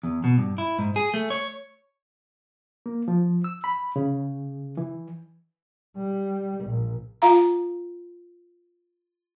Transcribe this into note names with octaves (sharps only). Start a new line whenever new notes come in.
E2
B2
G2
E4
G#2
G#4
A3
C#5
A#3
F3
E6
B5
C#3
E3
G3
A#1
F4 F5 A#5